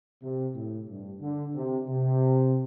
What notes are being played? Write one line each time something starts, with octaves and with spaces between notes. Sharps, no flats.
C3
A2
G2
D3
C3
C3